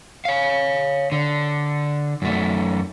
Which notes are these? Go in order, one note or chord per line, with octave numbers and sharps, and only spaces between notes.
C#5 F5
D3
F#2 A3